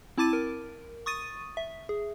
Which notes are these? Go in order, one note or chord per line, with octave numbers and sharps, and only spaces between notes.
C4 E4 A5 D6 A6 D#7
A#4
C#6 D#6 A6 D#7
E5
G#4